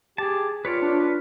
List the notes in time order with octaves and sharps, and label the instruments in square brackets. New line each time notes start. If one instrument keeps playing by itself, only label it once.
[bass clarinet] G4 [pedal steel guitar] G#4 A5
[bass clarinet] F4 [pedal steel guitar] B4 C#5 D5
[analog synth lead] D4
[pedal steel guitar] B4